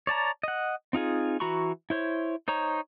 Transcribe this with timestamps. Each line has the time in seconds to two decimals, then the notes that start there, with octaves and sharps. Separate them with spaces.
0.07 C#5 D5 A5 A#5
0.43 D#5 F#5
0.93 C4 D#4 F4 G#4
1.40 E3 F#4 A#5 B5 C#6
1.90 E4 C5 C#5
2.48 D#4 C5 C#5 A#5